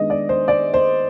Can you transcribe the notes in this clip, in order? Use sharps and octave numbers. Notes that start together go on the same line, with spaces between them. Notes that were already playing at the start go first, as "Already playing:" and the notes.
Already playing: D#3 G#3 B3 D4 D#5
D5
C5
D5
C5